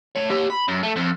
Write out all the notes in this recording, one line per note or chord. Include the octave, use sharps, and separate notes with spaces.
A3 C#5
G4 C#5
B5
F#2
A3
F2